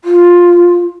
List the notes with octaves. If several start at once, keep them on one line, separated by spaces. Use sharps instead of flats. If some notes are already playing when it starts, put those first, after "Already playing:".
F4